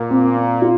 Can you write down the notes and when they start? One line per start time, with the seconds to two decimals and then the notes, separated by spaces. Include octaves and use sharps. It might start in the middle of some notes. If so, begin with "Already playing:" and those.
Already playing: A#2 A#3
0.10 C4
0.36 C4
0.62 F4